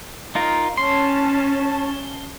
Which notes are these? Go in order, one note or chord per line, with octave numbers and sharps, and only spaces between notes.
D#4 F4 A#4
C#4 A5 C6